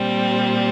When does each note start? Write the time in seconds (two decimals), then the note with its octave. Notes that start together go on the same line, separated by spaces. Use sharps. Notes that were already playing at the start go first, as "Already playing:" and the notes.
Already playing: A#2 G3 C4